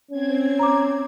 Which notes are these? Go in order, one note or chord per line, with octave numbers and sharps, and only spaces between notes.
C4 C#4 G#6
A#5 D6